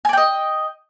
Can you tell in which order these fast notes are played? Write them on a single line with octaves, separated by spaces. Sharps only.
G#5 D5 G5 D#5